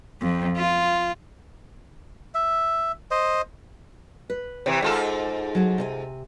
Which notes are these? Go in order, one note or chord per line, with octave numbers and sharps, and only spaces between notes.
F2
F4
E5
C5 D#5
B4
C3 E3
G#2 F4 A4
F#3 G#4
C3 C#5 G#5